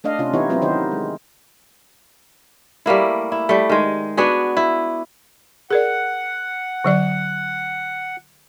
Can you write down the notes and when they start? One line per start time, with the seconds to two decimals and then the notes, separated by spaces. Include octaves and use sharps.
0.04 A3 D4 D#5 F5
0.19 C3 C#4 D4 F4
0.34 E3 B3 D#4 E4 G4 C#5
0.49 F#3 B3 C4 E4 F4
0.61 D#3 B3 D#4 F4 G4 C5
0.92 G#3
2.86 G3 A3 A#3 E4
3.32 E4
3.49 G3 A3
3.69 D#3 G#3
4.17 B3 D4 F#4 G#4
4.57 E4
5.70 G#4 A#4 D5 F#5
6.85 D3 F#3 D5